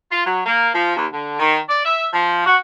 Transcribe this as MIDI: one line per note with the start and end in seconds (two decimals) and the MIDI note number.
0.11 0.26 65
0.27 0.41 54
0.46 0.70 58
0.74 0.92 53
0.96 1.06 39
1.13 1.38 50
1.40 1.58 51
1.68 1.82 74
1.85 2.08 76
2.14 2.46 53
2.46 2.56 66